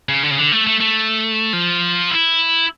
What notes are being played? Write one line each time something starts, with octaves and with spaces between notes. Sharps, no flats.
C#3
D3
C#3
D3
A3
A3
A3
F3
E4